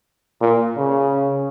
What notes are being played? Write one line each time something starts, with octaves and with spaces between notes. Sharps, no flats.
A#2
C#3